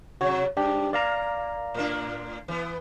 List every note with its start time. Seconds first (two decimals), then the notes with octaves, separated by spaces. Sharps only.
0.21 C3 F#3 F#4 C#5
0.57 G2 D4 G4
0.93 A#3 D5 F5 A#5
1.74 A2 A#3 D4
2.48 E3 B3